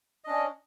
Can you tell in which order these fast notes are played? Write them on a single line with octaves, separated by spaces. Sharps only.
D#5 D4 C#4